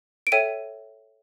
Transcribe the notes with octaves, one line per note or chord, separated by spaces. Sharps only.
D7
A4 C#5 E5 G5 D#7